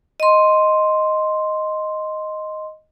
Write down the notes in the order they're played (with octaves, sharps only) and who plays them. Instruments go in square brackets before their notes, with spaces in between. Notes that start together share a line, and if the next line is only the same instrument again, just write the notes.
[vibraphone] D#5 C6